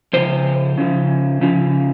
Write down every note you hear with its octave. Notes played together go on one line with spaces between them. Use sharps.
C#3 F3 C5
C#3 F3
C#3 F3